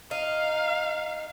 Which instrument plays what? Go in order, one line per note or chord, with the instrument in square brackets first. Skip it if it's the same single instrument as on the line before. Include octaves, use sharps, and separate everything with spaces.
[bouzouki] D#4 [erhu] F5